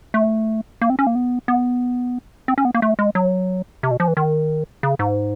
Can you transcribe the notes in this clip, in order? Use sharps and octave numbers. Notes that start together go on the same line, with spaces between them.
A3
A#3
C4
C#4
A#3
B3
B3
C4
C#4
B3
A#3
A3
G#3
F#3
C3
B2
F3
E3
D#3
C#3
G#2